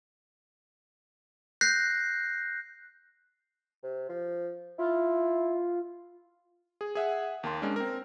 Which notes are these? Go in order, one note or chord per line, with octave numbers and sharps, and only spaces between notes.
F#6 G6 A#6 C7
C3
F3
E4 F4
G#4
G#4 E5 F#5
D#2 A#3 A5 C6
G#3 A#3 C#4 D4
C4 A#4